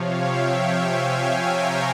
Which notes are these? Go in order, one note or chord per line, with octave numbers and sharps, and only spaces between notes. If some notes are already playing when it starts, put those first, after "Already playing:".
Already playing: C3 F3 C#5 F5
E5 G5
E5 G5
F5 G#5
F5 G#5
G5 A#5